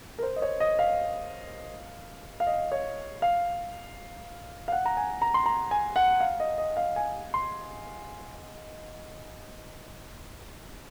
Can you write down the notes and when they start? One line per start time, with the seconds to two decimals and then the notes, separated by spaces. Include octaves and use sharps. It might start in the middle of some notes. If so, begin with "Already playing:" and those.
0.19 A#4
0.23 C5
0.36 D#5
0.42 C#5
0.60 D#5
0.79 F5
2.40 F5
2.47 D#5
2.72 C#5
3.22 F5
4.68 F5
4.72 F#5
4.86 A#5
4.97 G#5
5.22 A#5
5.34 C6
5.46 A#5
5.71 G#5
5.96 F#5
6.21 F5
6.40 D#5
6.58 D#5
6.77 F5
6.96 G#5
7.34 C6